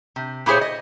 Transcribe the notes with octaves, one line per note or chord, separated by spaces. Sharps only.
C3
A#2 E4 G4 G#4 C5 C#5
D#5